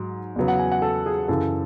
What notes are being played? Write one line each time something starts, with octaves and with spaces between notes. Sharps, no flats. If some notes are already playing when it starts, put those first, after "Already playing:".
Already playing: G#2 F#3
E2 C#3 F#3 B3
F#5
G#5
F#5
A4
G#4
F#2 C#3 E3 A4